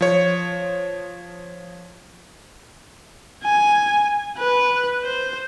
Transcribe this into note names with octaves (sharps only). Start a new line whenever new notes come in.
F3 C#5
G#5
B4
C5